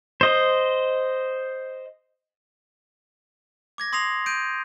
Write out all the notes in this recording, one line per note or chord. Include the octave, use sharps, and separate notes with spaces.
C5 D#5
D6 G#6 A#6
C6 D#6 A#6 C7 F7
G6 D7 D#7